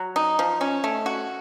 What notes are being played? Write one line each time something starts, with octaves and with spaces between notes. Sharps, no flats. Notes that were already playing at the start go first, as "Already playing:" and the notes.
Already playing: F#3
D#4
F3
C#4
A3
F#4